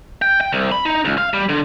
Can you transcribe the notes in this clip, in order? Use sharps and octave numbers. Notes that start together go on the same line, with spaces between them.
G5
G5
C2
B5
D#4
C#2
F5
G3
D3